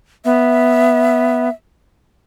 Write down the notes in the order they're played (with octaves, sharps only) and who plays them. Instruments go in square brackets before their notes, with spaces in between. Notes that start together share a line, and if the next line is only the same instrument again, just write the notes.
[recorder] B3 [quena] E5